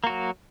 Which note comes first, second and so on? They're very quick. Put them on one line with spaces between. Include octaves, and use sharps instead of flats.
A#3 F#4 F#3